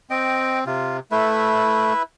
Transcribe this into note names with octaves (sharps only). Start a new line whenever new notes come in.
C4 D#5 G5
C3 F4
A3 E4 B4 E5